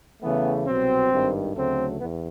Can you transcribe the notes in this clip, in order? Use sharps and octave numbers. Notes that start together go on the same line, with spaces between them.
E2 C#3 E3 A3 B3
C2 B2 F#3 C4
G#1 G2 D#3
D2 C#3 F#3 A3 C4
E2 B3